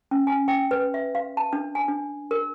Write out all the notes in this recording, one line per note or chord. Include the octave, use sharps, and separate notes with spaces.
C#4
G#5
G5
B4
E5
F5
A5
D4
G#5
D4
A#4